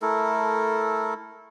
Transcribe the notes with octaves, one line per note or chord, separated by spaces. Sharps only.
A3 E4 A4 A#4